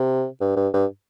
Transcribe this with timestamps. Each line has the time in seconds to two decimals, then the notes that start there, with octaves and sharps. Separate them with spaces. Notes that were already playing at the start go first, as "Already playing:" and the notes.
Already playing: C3
0.40 G2
0.56 G2
0.73 G2